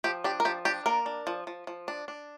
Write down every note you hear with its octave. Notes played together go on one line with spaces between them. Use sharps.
F3 G4
D4 G4
A#4
F3 G4
D4 G4
A#3 A#4
D4
F3
F3
F3
D4
D4